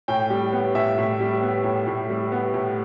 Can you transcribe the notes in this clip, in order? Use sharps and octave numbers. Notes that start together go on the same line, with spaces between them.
A2 G5
G3
B3
A2 E5
A2
G3
B3
A2
A2
G3
B3
A2